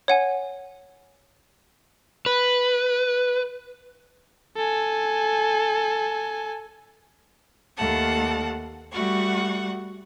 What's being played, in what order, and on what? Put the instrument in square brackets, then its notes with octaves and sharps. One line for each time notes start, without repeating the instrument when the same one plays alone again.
[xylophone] C#5 F#5 G#5
[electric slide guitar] B4
[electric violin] A4 G#5
[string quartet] D#2 A3 A#3 A4 F#5 A5
G3 A3 F#4 F#5 C#6